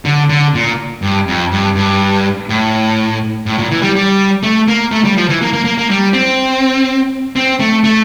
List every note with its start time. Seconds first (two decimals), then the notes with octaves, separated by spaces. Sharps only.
0.05 D3
0.29 D3
0.54 A#2
1.02 G2
1.27 F2
1.51 G2
1.75 G2
2.49 A2
3.46 A2
3.58 A#2
3.71 E3
3.82 G3
3.95 G3
4.43 A3
4.68 A#3
4.92 A3
5.04 G3
5.17 F3
5.29 E3
5.41 A#3
5.53 A#3
5.65 A#3
5.78 A#3
5.90 G3
6.13 C4
7.36 C4
7.60 A3
7.84 A3